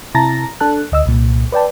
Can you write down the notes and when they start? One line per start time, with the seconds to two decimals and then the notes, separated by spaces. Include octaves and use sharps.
0.14 C3 E4 A5 A#5 A6 A#6
0.60 D4 A4 A5 F#6
0.92 D2 D#5 E6
1.06 C2 A#2
1.52 B4 D5 G5 A5